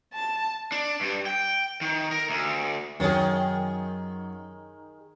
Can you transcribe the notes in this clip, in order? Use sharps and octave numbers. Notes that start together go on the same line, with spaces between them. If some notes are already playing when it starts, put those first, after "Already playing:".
A5
D4
G2
G5
D#3
A#4
D2
F#2 D#3 G#4 C#5